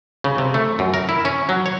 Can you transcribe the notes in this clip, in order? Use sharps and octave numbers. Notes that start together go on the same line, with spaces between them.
C#3
C3
A3
F#2
A#4
E4
C#4
F#3
C#5